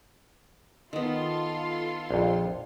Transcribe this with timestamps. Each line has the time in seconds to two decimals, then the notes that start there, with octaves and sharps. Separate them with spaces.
0.93 D#3 B3 F4 A4 C6
2.11 A#1 F2